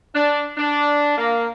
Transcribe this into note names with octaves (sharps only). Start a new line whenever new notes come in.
D4
D4
A#3